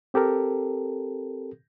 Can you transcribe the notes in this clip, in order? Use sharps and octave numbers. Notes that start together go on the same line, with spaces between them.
C4 G4 A4 A#4